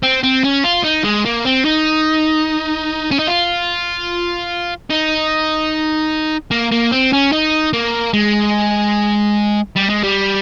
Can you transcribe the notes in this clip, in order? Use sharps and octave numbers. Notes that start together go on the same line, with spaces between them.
C4
C4
C#4
F4
D#4
G#3
A#3
C4
D#4
C#4
D#4
F4
D#4
A#3
A#3
C4
C#4
D#4
A#3
G#3
G3
G#3
G3